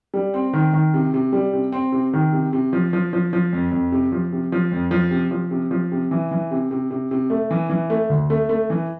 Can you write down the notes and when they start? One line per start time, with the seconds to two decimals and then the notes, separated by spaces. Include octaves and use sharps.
0.14 G3
0.34 C4
0.53 D#3
0.73 D#3
0.94 C3
1.14 C3
1.33 G3
1.53 C3
1.72 C4
1.92 C3
2.13 D#3
2.33 C3
2.53 C3
2.73 F3
2.93 F3
3.13 F3
3.33 F3
3.53 F2
3.71 F2
3.92 C3
4.12 F3
4.32 C3
4.52 F3
4.72 F2
4.91 F3
5.11 C3
5.31 F3
5.51 C3
5.71 F3
5.92 C3
6.11 E3
6.31 E3
6.51 C3
6.71 C3
6.91 C3
7.11 C3
7.30 A3
7.51 E3
7.70 E3
7.90 A3
8.10 D2
8.30 A3
8.49 A3
8.70 E3